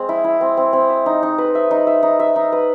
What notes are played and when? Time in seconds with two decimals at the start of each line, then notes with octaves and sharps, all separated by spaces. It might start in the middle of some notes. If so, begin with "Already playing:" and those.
Already playing: G#3 C4
0.09 E4
0.24 E4
0.41 C4
0.57 C4
0.73 C4
0.90 E5
1.06 D#4
1.23 D#4
1.38 B4
1.55 E5
1.71 D#4
1.87 E5
2.03 D#4
2.20 E5
2.36 D#4
2.52 B4